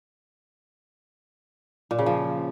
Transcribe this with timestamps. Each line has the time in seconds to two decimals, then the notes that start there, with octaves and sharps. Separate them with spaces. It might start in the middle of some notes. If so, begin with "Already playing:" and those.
1.91 A#2
1.99 C#3
2.06 F3